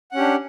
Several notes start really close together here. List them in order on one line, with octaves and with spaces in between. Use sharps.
F#5 C#4 G4 D4